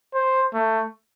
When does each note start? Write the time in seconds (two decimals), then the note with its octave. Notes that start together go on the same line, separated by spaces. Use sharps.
0.14 C5
0.53 A3